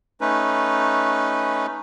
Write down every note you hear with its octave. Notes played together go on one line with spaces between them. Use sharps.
A3 C#4 D#4 B4